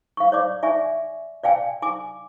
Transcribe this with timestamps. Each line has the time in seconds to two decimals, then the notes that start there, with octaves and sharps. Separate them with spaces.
0.17 F5 C#6
0.32 C#5 D5 D6
0.63 D5 E5 G#5 C#6
1.44 D5 F5 G5 G#5
1.82 G#5 D6